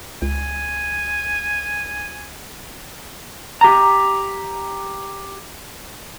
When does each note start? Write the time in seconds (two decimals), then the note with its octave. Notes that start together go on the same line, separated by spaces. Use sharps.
0.22 C#2 G#5
3.61 G4 A#5